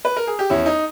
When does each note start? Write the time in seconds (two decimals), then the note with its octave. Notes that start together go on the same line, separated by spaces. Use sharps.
0.05 B4
0.16 A#4
0.27 G#4
0.39 G4
0.50 E2 C#4 E4
0.66 D#4